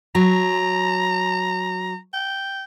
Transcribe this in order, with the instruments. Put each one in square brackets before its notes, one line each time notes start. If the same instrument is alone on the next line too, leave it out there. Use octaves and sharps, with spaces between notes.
[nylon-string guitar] F#3 [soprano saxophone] A#5
[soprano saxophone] G5